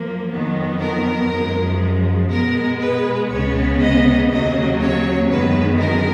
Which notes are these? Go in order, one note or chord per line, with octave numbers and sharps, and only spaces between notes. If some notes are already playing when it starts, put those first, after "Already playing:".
Already playing: F#2 F3 A#3
F2 D#3 F#3 B3
A#4
F#2 F3 G#3
B2 G#3 B3 A#4
B4
C#2 C#3 G#3 B3 C#5
D#5
D#2 C#3 F#3 A#3 D#5
C#5
F#2 D#3 G#3 B3 B4
A#4